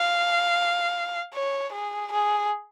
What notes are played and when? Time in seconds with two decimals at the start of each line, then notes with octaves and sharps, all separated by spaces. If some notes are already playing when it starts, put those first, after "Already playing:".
Already playing: F5
1.34 C#5
1.73 G#4
2.13 G#4